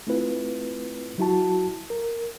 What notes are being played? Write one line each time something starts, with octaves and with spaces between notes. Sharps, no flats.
A3 C4 E4 F4 B4
F#3 E4 F#4 A5
A#4